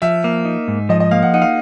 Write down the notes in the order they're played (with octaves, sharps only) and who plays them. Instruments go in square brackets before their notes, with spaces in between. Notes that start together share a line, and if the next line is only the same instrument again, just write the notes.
[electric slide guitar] F3 [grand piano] E5
[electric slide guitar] A#3
D#4
G#2
[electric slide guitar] F3 [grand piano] D#5
[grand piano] D#5
[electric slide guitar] A#3 [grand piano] F5
[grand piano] F#5
[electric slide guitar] D#4 [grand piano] F#5
[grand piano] F5